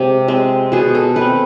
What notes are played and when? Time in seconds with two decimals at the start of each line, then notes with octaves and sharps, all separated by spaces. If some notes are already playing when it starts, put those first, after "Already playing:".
Already playing: C3 G#3 C4
0.28 G#3 C4
0.72 B2 G#4
0.95 A4
1.16 A3 B4
1.21 C4